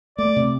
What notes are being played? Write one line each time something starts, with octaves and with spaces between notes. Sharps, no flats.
A3 D5
C3